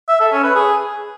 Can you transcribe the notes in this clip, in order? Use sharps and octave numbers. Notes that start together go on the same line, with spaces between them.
E5
A4
C#4
B4
G#4